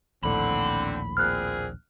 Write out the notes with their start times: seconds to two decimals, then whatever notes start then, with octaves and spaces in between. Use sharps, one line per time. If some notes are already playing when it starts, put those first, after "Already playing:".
0.24 A#1 D#2 A2 D3 C4 B5
1.17 A#2 C4 G#4 F6 F#6